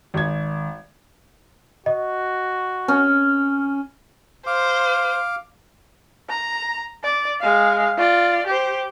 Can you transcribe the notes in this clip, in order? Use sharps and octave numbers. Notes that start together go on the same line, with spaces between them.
G#1 G#6
F#4 D#5
C#4
C5 F5 D6
A#5
D5
G#3 F5
F4 D5
G4 C5